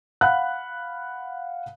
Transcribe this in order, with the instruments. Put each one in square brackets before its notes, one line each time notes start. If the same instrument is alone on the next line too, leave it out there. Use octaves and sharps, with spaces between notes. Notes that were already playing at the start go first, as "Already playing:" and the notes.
[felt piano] F5 F#5 B5 F#6